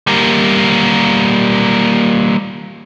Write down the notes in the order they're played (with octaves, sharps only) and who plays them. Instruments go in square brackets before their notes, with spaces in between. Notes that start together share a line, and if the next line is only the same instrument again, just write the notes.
[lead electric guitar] G3 A#3